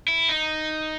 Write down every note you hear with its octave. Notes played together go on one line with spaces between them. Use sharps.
E4
D#4